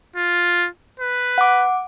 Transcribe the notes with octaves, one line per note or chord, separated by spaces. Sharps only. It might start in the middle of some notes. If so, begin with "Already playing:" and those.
F4
B4
F#5 D6